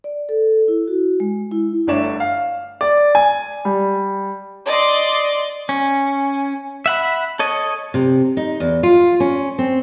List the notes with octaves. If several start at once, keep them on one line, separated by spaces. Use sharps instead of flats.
D5
A4
E4
F#4
G#3
E4
G1 D3 A3 C#5 D5 E7
F5
D5
G#5
G3
D5 D#5 C6
C#4
E5 F#5 B5
A4 C#5 D#5
C3
D#4
E2
F4
C#4
C4